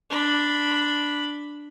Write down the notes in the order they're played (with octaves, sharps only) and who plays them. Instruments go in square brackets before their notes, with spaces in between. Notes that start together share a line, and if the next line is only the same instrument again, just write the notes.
[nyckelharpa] D4 B5